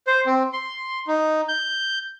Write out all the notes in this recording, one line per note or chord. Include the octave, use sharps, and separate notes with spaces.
C5
C4
C6
D#4
G6